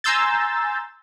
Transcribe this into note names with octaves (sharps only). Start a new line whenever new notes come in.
G#5 A#5 C6 E6 G6 A6